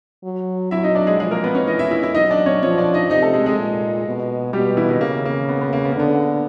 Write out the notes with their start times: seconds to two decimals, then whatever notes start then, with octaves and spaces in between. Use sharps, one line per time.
0.24 F#3
0.71 F#3 E4 E5
0.83 D#4 D#5
0.95 D4 D5
1.07 G#3 G#4
1.20 F3 G#3 G#4
1.31 A#3 A#4
1.44 B3 B4
1.55 C#4 C#5
1.67 E3 D#4 D#5
1.79 E4 E5
1.91 E4 E5
2.03 E4 E5
2.15 F#3 D#4 D#5
2.31 D4 D5
2.46 C#4 C#5
2.62 F3 C#4 C#5
2.78 D4 D5
2.94 D#4 D#5
3.10 C3 D#4 D#5
3.22 A3 A4
3.34 G#3 G#4
3.46 G#3 G#4
3.58 A#2
4.06 B2
4.53 B2 G3 G4
4.77 E3 E4
4.89 D#3 D#4
5.01 C#3 A#3
5.25 A#3
5.49 B3
5.61 B3
5.73 A#3
5.85 B3
5.92 A#3
5.97 D3 B3